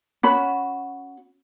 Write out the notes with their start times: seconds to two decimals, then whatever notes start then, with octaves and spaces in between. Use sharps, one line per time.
0.23 C#4 F#4 B5